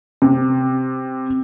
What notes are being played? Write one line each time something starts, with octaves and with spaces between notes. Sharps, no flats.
C3